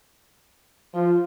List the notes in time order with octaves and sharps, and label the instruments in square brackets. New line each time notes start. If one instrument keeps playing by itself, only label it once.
[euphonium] F3 [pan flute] F4